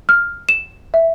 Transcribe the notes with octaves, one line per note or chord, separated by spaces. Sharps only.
F6
E7
E5